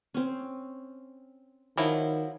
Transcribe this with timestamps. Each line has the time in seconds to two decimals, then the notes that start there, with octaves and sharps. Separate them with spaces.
0.14 C4 C#4
1.78 D#3 F3 F#3 E4